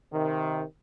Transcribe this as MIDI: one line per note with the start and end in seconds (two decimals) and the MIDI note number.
0.12 0.62 48
0.12 0.62 51